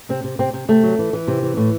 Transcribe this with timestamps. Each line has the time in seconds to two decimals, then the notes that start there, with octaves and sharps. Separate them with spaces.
0.09 C3 C4
0.24 C3
0.39 C3 C4
0.53 C3
0.68 C3 A3
0.83 F#3
0.99 E3
1.13 E3
1.28 C3
1.42 E3
1.57 A2